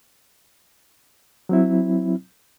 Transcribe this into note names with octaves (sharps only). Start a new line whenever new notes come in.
F#3 C4 E4